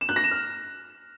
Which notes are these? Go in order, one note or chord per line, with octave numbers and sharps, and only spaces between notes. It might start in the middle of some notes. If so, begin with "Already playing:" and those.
E7
F#6
A#6
E7
F6